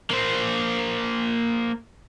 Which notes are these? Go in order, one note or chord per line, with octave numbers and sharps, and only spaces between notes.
A#3 C5